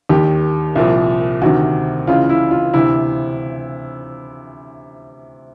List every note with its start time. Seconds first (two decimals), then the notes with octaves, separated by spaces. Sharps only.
0.09 D#2 D#3 G4
0.75 C2 A#2 F3
1.41 D2 C3 D#3 F#4
2.07 C#2 C#3 E3 F4
2.29 E4
2.51 F4
2.74 D2 C3 E3 E4